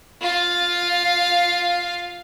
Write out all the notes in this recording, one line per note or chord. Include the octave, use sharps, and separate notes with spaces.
F4 F5